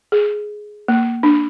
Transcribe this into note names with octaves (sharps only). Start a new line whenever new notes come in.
G#4
A#3
D4